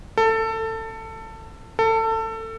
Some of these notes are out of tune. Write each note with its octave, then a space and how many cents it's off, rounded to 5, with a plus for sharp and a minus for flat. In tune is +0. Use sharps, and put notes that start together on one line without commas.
A4 +20
A4 +25